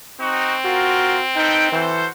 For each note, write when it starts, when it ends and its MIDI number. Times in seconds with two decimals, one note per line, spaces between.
0.20 1.89 60
0.20 0.56 63
0.20 0.56 66
0.65 1.17 65
0.65 1.23 66
0.65 1.17 70
1.36 1.71 63
1.36 1.68 69
1.36 1.68 71
1.36 1.68 79
1.72 2.07 52
1.72 2.09 66
1.72 2.09 69
1.72 2.09 72